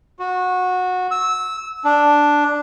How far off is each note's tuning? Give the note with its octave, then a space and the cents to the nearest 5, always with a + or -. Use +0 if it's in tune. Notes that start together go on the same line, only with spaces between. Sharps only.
F#4 -20
E6 -15
D4 +0